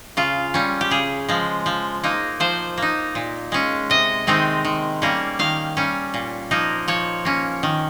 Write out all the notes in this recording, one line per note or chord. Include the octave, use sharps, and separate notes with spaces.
C#3 F4
G3 C#4
G4
C#3 G#4
F3 G#3
F3
A#3 D#4
F3 C5
A#3 D#4
A#2
G#3 C#4
C3 D#5
D#3 G#3 C4 D#4
D#3
G3 A#3 C#4
D#3 F5
G3 C#4
A#2
F3 A#3 D#4
F3 C#5
A#3 C#4
D#3